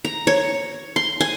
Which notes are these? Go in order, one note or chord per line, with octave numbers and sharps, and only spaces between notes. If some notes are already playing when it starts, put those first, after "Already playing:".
A#5
C#5
C6
G#5